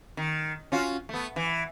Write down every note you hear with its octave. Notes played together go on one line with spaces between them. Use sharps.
D#3
C#4 F4 F#4
A3 B3
E3